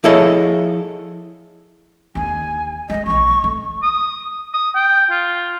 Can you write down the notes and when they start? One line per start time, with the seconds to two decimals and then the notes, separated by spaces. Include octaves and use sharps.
0.04 F3 E4 G#4 A4 C#5 D#5
2.15 D#2 D3 G#5
2.90 G#3 B3 D#5
3.06 A#1 E3 C#6
3.44 A3
3.83 D#6
4.54 D#6
4.75 G5
5.11 F4